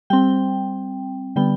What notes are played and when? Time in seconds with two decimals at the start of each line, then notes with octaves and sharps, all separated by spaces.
0.10 G3 C4 G5
1.36 D3 G3 B3 G5